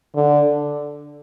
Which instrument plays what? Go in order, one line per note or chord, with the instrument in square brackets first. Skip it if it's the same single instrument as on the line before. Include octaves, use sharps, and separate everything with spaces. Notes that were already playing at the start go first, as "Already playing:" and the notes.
[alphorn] D3